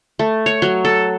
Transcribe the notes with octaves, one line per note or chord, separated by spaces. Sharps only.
A3
C#5
F#3
A4